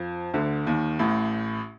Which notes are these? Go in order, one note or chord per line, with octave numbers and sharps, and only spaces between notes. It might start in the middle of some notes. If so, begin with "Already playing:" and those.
Already playing: F2 F3
D2 D3
D#2 D#3
A1 A2